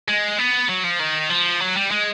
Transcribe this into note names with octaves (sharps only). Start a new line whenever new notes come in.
G#3
B3
F#3
F3
D#3
F3
F#3
G3
G#3